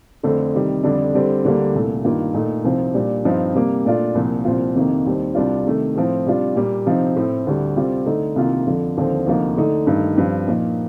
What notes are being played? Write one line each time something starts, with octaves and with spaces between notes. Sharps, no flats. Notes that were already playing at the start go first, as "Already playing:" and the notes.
F2 D3 A3 C4
C3 D#3 G3
F2 D3 G3 D4
D3 G3 C4
D2 D3 G3 A#3
C2 A#2 A3
G2 D#3 A#3 F4
A#2 A3 D#4
C2 C3 F3 C4 D#4
A#2 G3 D4
G2 F3 C4 D#4
C3 G3 A#3
A#2 A3 D4 F4
C2 A#2 F3
C2 A#2 F3 C4 F4
F2 C3 D#3 A#3
D#2 D#3 G3 C4
C2 C3 G3 D4 F4
C3 D#3 A3
A2 F3 C4
C3 G3 D4 F4
A#2 G3 A#3
C3 F3 C4 D#4
A2 A3 C4
D2 D3 G3
C3 G3 C4 F4
D3 A3 D#4
C2 C3 D#3 A#3 F4
F2 D3 F3
D#2 D3 F3 C4
D2 C3 F3 A#3 D#4
D3 A3 D#4
G2 D#3 A3 D#4
G2 F3 C4
A#2 F3 A#3 D#4